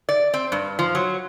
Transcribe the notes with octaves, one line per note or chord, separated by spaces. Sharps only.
D5
C4
G2
F3
F#3